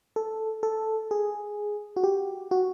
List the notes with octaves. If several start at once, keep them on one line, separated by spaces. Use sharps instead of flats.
A4
A4
G#4
F#4
G4
F#4